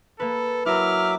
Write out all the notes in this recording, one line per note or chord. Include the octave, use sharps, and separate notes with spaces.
A#3 A4 B4
F#3 E4 A#4 E5 D6 F6